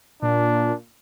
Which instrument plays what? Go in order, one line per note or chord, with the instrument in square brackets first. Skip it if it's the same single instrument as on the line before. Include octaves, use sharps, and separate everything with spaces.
[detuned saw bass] A#2 [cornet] D4